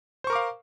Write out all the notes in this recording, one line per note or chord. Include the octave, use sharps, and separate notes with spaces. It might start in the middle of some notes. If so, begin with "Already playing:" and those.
A#4 C5 F5 C#6 D6